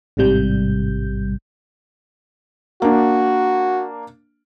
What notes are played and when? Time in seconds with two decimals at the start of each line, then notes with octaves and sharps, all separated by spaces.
0.17 A1 G#2 C3 G3 G6
2.82 A#3 D4 F#4